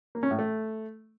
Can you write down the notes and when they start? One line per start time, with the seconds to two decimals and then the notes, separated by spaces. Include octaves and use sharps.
0.15 A#3
0.23 C#4
0.31 A2
0.39 A3